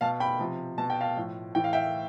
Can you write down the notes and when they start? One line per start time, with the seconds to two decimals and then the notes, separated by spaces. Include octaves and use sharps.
0.01 B2 F5 A5
0.20 G5 B5
0.39 C3 F3
0.78 B2 A5
0.90 G5
1.01 F5 A5
1.16 A2 F3
1.55 A2 E3 G5
1.64 F5
1.73 E5 G5